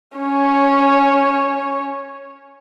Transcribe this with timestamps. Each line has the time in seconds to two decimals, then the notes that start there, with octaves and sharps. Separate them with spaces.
0.17 C#4 C#5